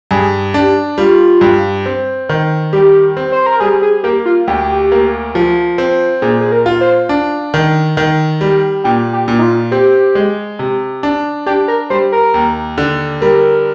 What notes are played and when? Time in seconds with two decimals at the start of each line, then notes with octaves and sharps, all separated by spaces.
0.11 G2 G#4
0.54 D4 G4
0.98 G3 F4
1.41 G2
1.86 C4
2.29 D#3
2.73 G3 G4
3.17 C4
3.32 C5
3.46 A#4
3.60 G3 G#4
3.82 G#4
4.04 A#3 G4
4.26 F4
4.48 D2 G4
4.92 A#3
5.35 F3
5.78 C4
6.22 A#2 G#4
6.41 G#4
6.52 A#4
6.66 F4
6.81 C5
7.09 D4
7.54 D#3
7.97 D#3
8.41 G3
8.84 A#2 G4
9.13 G4
9.28 A#2
9.39 D#4
9.42 F4
9.71 C4 G4
10.15 G#3
10.59 C3
11.03 D4
11.46 D4 G4
11.68 A#4
11.90 G3 C5
12.12 A#4
12.34 D#2
12.78 D3
13.21 G3 A#4